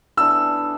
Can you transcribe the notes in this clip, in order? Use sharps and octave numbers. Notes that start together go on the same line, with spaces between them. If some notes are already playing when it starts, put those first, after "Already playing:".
E3 B3 D4 A4 E6